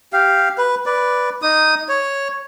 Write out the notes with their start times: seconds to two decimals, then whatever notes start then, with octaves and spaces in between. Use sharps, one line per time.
0.13 G4 F5
0.58 B4
0.86 B4 D5
1.42 D#4 D#6
1.89 C#5